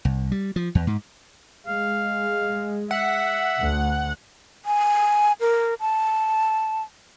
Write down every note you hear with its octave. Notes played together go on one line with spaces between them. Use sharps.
C2
G3
F3
E2
G#2
G#3 F5
E5 F#5
D2
G#5
A#4
A5